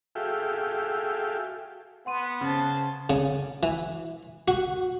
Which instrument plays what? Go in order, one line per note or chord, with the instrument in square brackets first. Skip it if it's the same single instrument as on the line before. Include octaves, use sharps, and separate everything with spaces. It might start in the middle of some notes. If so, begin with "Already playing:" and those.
[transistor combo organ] F#4 G#4 A4 E5 F5 G5
[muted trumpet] B3 [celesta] F#5 C6 D#7
[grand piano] C#3 [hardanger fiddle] C5 A5
[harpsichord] C#3
E3
F#4